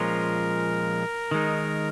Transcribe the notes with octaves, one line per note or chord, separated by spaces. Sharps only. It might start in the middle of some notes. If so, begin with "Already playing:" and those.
Already playing: A#2 F3 G#3 C#4 F4 A#4
D#3 G#3 D#4